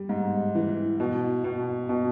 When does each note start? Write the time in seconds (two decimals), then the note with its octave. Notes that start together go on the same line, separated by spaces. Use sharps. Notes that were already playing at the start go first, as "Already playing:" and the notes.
Already playing: G3
0.09 G#2
0.55 E3
1.00 B2
1.44 B2
1.89 B2